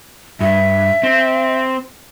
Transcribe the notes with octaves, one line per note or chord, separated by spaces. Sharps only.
G2 E5
C4